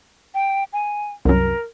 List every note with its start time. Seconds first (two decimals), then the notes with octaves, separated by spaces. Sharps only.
0.34 G5
0.73 G#5
1.25 C2 F#2 A#4